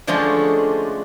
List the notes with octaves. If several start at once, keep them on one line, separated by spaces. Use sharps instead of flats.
D3 F3 G#3 A3 C#4 D4